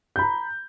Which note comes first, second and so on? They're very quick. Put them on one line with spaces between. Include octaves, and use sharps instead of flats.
G6 B5 A#5